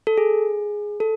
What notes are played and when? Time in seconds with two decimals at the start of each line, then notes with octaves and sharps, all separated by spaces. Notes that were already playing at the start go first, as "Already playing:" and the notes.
0.07 A4
0.18 G#4
1.00 A4